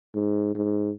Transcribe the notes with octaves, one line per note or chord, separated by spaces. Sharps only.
G#2
G#2